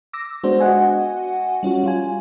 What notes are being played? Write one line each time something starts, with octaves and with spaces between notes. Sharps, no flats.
D6 E6 A#6
G#3 B3 D4 F#4 C5
F#4 D#5 F#5 G#5
G3 C#4 F4 F#4
G3 F4 G#5